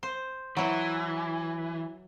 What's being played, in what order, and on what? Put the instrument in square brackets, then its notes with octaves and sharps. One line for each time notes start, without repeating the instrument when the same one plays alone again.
[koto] C5
[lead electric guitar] E3 [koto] F#3 E4